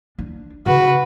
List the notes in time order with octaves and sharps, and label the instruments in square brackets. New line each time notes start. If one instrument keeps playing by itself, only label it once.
[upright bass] D4
[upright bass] C#3 [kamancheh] F#4 B4